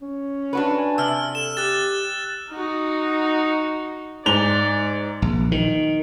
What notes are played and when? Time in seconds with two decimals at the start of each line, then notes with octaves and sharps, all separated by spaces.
0.01 C#4
0.53 D4 F#4 B4
0.78 G#5
0.98 C3 E6 F6
1.35 A4 E7
1.57 G4 F#6 A6
2.51 D#4 F#4
4.26 G#2 D5 F7 G7
5.22 A#1
5.52 D#3